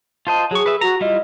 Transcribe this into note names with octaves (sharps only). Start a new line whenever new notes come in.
F4 C5 D#5 A5
F#3 G#4 C#6
B4 E5
F#4 A#5
G3 E4 F4 D#5